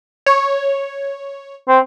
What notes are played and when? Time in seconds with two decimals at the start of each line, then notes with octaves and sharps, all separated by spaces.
0.26 C#5
1.68 C4